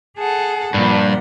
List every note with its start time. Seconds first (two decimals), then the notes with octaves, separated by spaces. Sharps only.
0.18 G#4 A4 F#5
0.74 G2 A#2 F3 F#5